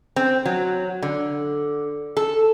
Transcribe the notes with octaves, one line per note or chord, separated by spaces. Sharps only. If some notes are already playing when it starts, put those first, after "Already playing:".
C4
F#3
D3
A4